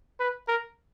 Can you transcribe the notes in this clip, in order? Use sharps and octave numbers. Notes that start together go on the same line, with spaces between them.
B4
A#4